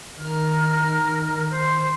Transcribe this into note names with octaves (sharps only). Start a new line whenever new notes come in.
D#3 A#4 F6
C5